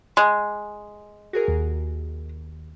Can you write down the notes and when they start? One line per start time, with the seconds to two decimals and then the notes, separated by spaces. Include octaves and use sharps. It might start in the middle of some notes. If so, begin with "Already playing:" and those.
0.17 G#3
1.33 F#4 G#4 A#4
1.48 D#2